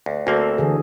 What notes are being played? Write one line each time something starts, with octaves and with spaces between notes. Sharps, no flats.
D2
D2 A#3 C4 F#4 A4
D3 E3 G#4